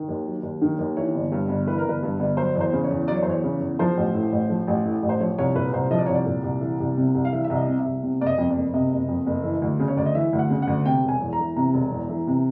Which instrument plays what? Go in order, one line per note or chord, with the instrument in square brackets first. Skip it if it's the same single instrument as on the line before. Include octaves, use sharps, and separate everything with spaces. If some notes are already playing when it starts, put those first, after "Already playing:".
Already playing: [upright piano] D#3
D#2
F#3
D#2
D#3
D#2
E3 C#5
G1
G2
G1
E3 B4
A#4
G1 B4
G2
G1
F#3 C5
E2 C5
C#3
C#5
E2
F#3 D5
C#5
C5
E2 C#5
C#3
E2
F3 C5
A1
A2
A1
F3
A1
A2
A1
C5
F3 C#5
C2 C#5
A#2 B4
C2 C5
F3 D#5
D5
C2 C#5
D5
A#2
C2
E3
C2
C3
C2
F5
E3 E5
E5
C2
D#5
C3
E5
C2
C3
F#1 D5
D#5
F2
D5
F#1
C3 D#5
F#1
F2
F#1
E3
D2
C#3
C#5
D2 D5
D#5
E3 E5
D2
F#5
C#3
F#5
D2
C3 G5
E1 G#5
E2
A#5
E3
C3 A#5
E1
E2
E3
C3